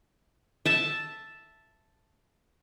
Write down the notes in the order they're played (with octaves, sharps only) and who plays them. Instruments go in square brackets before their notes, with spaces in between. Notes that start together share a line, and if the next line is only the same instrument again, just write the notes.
[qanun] E5 A5